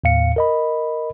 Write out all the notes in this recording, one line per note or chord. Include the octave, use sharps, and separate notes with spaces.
D#2 A2 F5 C#7
A#4 D#5 B5